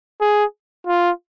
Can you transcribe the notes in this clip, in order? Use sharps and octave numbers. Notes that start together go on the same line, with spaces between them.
G#4
F4